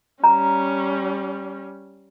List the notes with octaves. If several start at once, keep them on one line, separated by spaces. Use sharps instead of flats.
G3 C#4 A#5